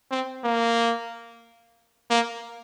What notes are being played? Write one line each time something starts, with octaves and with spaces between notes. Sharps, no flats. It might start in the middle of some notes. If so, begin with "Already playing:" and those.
C4
A#3
A#3